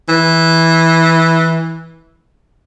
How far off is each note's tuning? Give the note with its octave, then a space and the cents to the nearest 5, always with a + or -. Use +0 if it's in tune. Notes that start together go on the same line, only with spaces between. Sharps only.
E3 -10